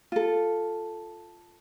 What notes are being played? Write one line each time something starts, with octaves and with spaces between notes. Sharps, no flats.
F4 A4